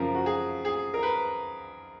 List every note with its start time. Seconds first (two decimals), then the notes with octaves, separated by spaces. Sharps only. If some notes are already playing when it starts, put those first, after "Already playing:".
Already playing: F#2 C#3 F3 A#4
0.15 F#4
0.26 G#4
0.65 G#4
0.94 A#4
1.03 B4